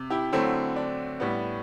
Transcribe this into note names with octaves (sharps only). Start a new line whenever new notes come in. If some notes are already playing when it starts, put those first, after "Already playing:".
Already playing: C3
E4 G4
D3 F#3 A3 C4 E4
D4
A2 G3 B3